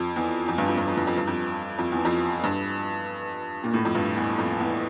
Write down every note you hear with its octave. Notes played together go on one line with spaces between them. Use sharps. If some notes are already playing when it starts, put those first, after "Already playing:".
Already playing: F2
E2
F2
G2
F2
G2
F2
G2
F2
G2
F2
F2
E2
F2
G2
A#2
A2
F2
G2
E2
F2
E2